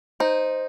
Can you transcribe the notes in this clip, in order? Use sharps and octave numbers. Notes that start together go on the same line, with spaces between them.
D#4 C5